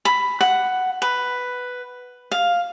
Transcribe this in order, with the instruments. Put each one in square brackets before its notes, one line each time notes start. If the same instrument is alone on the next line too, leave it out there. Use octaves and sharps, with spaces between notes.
[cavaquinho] B5
F#5
B4
F5